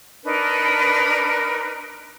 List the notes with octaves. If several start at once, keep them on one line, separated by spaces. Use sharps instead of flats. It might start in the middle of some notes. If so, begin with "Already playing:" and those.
D4 D#4 A#4 B4